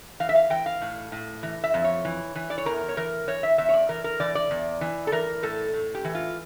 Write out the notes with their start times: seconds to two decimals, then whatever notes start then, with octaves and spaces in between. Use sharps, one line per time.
0.20 E3 F5
0.29 E5
0.35 F5
0.50 E3 G5
0.66 F5
0.81 A2
1.12 A2
1.43 E3
1.64 E5
1.74 F2
1.84 C#5
2.05 E3
2.35 E3
2.50 D5
2.58 C#5
2.66 E2 A#4
2.88 C#5
2.97 E3 A#4
3.27 E3 C#5
3.43 E5
3.58 E2 E5
3.69 C#5
3.74 D5
3.89 E3 A#4
4.04 A#4
4.20 E3 D5
4.35 D5
4.51 E2
4.81 E3
5.07 A4
5.12 E3 A#4
5.43 A2 A4
5.74 A2
5.95 G4
6.05 E3
6.15 F4